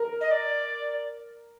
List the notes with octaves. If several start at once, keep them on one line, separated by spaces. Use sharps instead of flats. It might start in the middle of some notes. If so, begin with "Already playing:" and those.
Already playing: A#4
D#5
D5